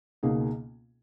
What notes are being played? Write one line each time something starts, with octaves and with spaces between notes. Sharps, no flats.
C#2 B2 A#3 D#4 G#4